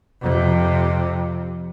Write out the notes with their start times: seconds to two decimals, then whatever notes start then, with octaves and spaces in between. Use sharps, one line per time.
0.21 F2 C3